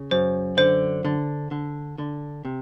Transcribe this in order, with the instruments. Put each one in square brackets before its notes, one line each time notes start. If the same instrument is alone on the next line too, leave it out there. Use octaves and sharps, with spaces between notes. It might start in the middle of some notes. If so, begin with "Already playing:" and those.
Already playing: [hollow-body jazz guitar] C#3
[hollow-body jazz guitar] F#2 [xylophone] C5
[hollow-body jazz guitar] D3 [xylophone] C5
[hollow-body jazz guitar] D3
D3
D3
C3